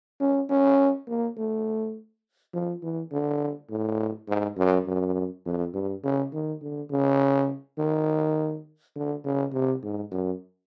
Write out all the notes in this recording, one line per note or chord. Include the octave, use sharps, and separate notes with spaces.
C#4
C#4
A#3
A3
F3
E3
D3
A2
G#2
F#2
F#2
F2
G2
C#3
D#3
D3
C#3
D#3
D3
C#3
C3
G#2
F#2